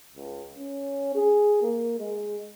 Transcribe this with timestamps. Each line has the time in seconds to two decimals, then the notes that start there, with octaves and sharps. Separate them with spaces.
0.16 C#2
0.56 C#4
1.15 G#4
1.62 A#3
1.99 G#3